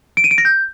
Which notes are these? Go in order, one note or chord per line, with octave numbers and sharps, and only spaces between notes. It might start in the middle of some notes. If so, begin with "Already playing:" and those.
D7
D#7
D7
A#6
G6